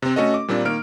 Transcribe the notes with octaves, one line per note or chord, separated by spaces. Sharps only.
C3 C4
A3 C#4 F#4 A4 D#5
D6
A#2 G3 A#3 C4 D4
D#3 A#3 F6 D7